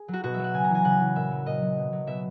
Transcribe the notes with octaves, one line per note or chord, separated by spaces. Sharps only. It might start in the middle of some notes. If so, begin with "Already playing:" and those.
Already playing: G#4
F#3
F#4
B2 F#4
F#3 E5
F#5
C#3 G#5
A#5
E3
G#5
C#3 F#5
E3
A#2 E5
F#3
A#2 D#5
F#3
B2
F#3
B2 E5